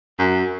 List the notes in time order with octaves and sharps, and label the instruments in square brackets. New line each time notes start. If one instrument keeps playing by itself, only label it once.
[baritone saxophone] F#2